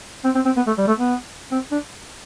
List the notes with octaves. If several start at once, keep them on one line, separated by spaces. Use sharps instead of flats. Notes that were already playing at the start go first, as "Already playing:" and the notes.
C4
C4
C4
B3
A3
G3
A3
B3
C4
D4